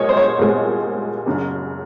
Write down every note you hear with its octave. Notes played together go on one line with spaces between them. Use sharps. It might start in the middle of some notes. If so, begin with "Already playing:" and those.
Already playing: C2 A#2 G#3 C#5 D#5
C5
C#5
C2 A#2 G#3
F#1 F#2 C#3